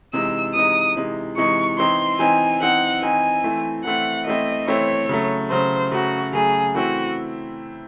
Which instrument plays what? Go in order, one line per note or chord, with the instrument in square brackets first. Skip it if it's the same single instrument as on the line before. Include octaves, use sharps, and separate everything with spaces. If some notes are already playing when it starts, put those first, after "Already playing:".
[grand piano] C3 E3 G#3 D#4 [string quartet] E6
[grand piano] C3 E3 G#3 D#4 [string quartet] D#6
[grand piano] C3 E3 G#3 D#4
[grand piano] C3 E3 G#3 D#4 [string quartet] C#6
[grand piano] E3 C4 D#4 [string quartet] C6
[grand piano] E3 C4 D#4 [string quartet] G#5
[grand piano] E3 C4 D#4 [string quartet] F#5
[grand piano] E3 C4 D#4 [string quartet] G#5
[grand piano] E3 A3 C4 E4
[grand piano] E3 A3 C4 E4 [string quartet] F#5
[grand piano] E3 A3 C4 E4 [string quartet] D#5
[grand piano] E3 A3 C4 E4 [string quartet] C#5
[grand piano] C#3 F#3 A3
[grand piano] C#3 F#3 A3 [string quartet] C5
[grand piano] C#3 F#3 A3 [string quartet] F#4
[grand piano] C#3 F#3 A3 [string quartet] G#4
[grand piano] E3 A3 C4 E4 [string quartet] F#4